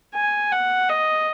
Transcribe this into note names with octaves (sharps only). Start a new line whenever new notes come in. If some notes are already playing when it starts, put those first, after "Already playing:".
G#5
F#5
D#5